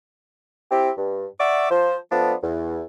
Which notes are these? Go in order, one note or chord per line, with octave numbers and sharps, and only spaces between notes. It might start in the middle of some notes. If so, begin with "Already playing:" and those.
C4 E4 G4
G2
D5 E5 F#5 C#6 D6
F3 C5
F3 A3 B3 D4
E2